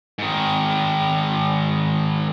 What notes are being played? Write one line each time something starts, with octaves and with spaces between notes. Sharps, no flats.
G#2 D#3